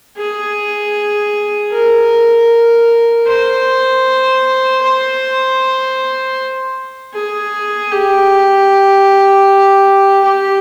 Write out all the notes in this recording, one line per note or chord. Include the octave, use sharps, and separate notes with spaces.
G#4
A#4
C5
C5
G#4
G4
G4